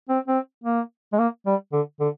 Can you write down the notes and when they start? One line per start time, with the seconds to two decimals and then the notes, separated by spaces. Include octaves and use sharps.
0.09 C4
0.28 C4
0.64 A#3
1.13 G#3
1.19 A#3
1.46 G3
1.72 D3
2.00 D3